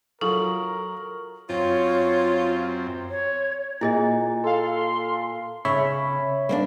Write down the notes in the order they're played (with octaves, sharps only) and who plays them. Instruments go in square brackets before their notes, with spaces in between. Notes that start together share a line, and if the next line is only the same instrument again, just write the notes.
[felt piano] F#3 F4 [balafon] A4 [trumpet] A#4 [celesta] C#6 D#6 F#7
[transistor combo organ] F#2 C4 [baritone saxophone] F4 [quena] C#5
[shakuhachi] C#5
[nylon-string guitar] A#2 [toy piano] E4 G#4 D#5
[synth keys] A4 F5 [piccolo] C6
[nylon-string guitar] C#3 [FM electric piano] C#5 E5 B5
[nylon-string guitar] A#3 C#4 D4